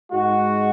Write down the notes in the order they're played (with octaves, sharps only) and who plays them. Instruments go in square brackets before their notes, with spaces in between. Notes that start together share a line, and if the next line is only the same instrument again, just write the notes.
[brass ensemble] G#2 G#3 F#4